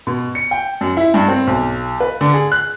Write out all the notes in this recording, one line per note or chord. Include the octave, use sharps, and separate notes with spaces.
B2
C#7
G5
F#2
E4
G2
C4
B1
B4
D3
G#4
F#6